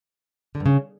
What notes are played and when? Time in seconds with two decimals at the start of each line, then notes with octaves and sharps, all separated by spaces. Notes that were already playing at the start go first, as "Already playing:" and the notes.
0.55 D3
0.60 G2
0.66 C#3